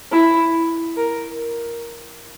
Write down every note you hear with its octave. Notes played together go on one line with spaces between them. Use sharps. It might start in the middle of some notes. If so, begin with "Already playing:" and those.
E4
A#4